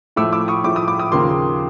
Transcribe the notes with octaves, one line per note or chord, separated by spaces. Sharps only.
A2 F3 A3 D6 E6
D6 E6
C#6 D#6
A2 F3 A3 D6
D#6
D6
D#6
D#2 C#3 F3 A#3 C6 D6